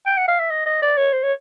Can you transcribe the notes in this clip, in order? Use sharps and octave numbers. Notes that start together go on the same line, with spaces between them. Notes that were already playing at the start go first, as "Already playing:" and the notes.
G5
F#5
F5
E5
D#5
D#5
D5
C#5
C5
C#5